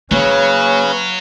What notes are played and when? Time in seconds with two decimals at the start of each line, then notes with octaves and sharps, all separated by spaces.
0.11 C#3 F#3 A#3 C#4 B4 C#5